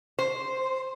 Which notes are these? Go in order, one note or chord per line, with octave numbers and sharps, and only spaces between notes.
C5